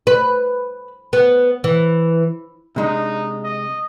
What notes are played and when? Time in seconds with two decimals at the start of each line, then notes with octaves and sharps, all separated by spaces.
0.07 B4
1.13 B3
1.64 E3
2.76 C3 G#3 D4 D#4
3.43 D#5